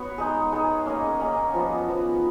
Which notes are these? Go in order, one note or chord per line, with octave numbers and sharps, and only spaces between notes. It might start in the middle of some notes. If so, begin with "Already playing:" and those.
Already playing: B3 F#4 C#5
G#3 D#4 G#4
G#3 D#4 G#4
A#3 C#4 G#4 D#5
A#3 C#4 G#4 D#5
F3 B3 F#4
F3 B3 F#4